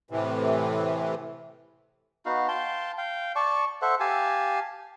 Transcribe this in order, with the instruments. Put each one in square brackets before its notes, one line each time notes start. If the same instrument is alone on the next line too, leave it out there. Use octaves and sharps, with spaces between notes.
[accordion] A2 C3 E3
[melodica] B3 D#4 F#4 F5
F5 G5 A5 C6
F5 G5
D5 A5 C#6
A4 C5 E5 F#5
G4 F5 G#5 A5